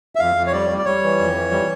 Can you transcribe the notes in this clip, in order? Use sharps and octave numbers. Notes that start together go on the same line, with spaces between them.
E5
F2 F5
F2
C#5
G3 D5
G3
D5
G3 C#5
E3
F2
E3
G3